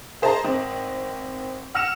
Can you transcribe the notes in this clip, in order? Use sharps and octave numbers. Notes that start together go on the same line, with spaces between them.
G#4 C5 D#5 A5 A#5
G#1 C4 D#5
F#5 E6 F6 A#6 C#7 E7